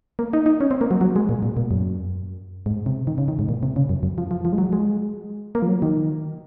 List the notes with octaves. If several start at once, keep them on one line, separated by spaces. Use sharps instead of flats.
A#3
D#4
D#4
C#4
C4
A#3
F#3
F#3
G#3
A#2
A#2
A#2
F#2
G#2
C3
D#3
C#3
D#3
G#2
A#2
C3
C#3
F#2
F#2
F3
F3
F3
G#3
F#3
G#3
A#3
F3
F#3
D#3